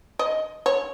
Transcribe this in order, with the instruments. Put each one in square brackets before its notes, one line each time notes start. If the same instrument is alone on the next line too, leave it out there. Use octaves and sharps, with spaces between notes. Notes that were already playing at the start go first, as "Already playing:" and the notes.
[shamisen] D#5
C#5